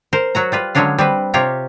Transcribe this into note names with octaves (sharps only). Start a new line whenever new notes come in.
A#4 C5
F#3 F#4 A#5
G3 F4 B4
D3 F#3 G#3 C#4 D4 F5
G3 C4 B4
C3 F4 G4 C#5 A#5